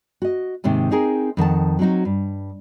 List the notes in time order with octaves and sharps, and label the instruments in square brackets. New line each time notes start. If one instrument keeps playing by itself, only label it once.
[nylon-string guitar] F#4 D#5
D#2 G#2 C3 D#3
C4 D#4 G#4 A#4
F2 D#3 F#5 A5
F#3 C4 D#4 F#4
G2